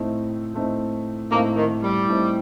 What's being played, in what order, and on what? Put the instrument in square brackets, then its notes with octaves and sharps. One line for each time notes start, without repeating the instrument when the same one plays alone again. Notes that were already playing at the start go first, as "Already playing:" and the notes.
Already playing: [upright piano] A2 A3 C4 D#4
A2 A3 C4 D#4
[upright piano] A2 A3 C4 D#4 [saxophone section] A#3
[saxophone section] D#3
G3
[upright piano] A2 A3 C4 D#4